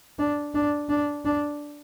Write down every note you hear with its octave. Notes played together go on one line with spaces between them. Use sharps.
D4
D4
D4
D4